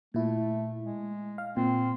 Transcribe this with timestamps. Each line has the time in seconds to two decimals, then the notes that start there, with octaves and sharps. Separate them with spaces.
0.14 A#2 A3 E4
0.83 G#3
1.38 F5
1.57 A#2 C4